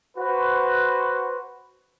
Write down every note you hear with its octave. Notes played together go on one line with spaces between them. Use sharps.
F#4 B4 C5